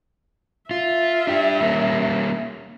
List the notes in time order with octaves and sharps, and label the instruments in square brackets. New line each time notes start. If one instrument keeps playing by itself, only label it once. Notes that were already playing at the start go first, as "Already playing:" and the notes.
[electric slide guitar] F4 [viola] E5
[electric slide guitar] D4 G4
G3 A#3 C#4